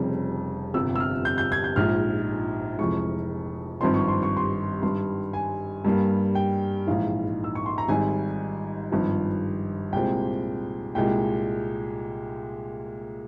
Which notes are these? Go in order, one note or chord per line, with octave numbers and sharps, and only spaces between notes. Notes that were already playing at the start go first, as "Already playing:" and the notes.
Already playing: F1 F2 C#3 G3 C4
G1 F2 C3 F3 E6
E6
F6
G6
G6
G#6
G6
A#1 G#2 F3 F6
F1 F2 E3 G#3 C#6
G#1 G2 F3 C4 C6
C#6
C6
C#6
C6
G#1 G2 G3 C6
G#5
G2 G3 A#3
G5
A#1 G#2 E3 F5
E6
C#6
C6
A#5
G#1 G#2 G3 G#5
G#1 G2 F3
C2 A#2 G#3 C4 G5
C2 A#2 G#3 G5